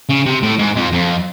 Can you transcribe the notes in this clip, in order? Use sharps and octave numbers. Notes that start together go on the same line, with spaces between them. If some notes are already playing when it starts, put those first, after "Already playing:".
C#3
C3
A2
G#2
F2
F2